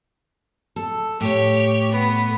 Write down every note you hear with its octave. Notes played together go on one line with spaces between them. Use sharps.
A4
A2 G4 C#5
B3